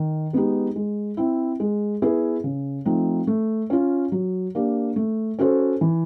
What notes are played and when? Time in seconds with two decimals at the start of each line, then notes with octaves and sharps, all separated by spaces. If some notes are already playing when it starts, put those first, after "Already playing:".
Already playing: D#3
0.33 G#3 B3 D#4 G4
0.76 G#3
1.17 C4 E4
1.60 G#3
2.02 B3 E4 G#4 B4
2.44 C#3
2.85 F3 A3 C4 D#4
3.27 A3
3.70 C#4 F4
4.12 F#3
4.55 A#3 D4 G4
4.96 A3
5.39 C#4 F#4 A4 C5
5.81 E3